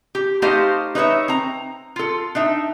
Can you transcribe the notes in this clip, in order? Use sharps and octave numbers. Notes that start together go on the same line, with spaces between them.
G4
A3 D#4 G4 C5 D#5 F5
D#4 B4 C#5 E5
C4 A#5
F4 A4
D4 D#4 E5